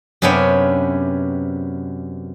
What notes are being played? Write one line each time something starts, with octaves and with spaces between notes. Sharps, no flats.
F#2 C3 B3 C#4 D4 G5